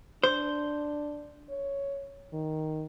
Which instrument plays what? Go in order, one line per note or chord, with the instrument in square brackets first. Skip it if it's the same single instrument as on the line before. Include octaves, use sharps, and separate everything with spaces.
[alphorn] D4 [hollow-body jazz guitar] C5
[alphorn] C#5
D#3